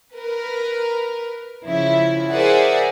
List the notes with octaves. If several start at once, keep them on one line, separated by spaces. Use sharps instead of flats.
A#4 B4
C#3 F3 E4
G#4 A#4 C5 D5 E5 F#5